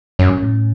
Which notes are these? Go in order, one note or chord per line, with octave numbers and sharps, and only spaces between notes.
F#2 C#4
A2